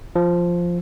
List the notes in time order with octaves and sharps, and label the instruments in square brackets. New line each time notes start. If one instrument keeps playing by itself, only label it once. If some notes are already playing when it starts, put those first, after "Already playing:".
[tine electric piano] F3